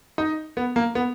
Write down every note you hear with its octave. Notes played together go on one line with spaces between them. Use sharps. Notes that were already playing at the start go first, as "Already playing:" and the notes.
D#4
B3
A#3
B3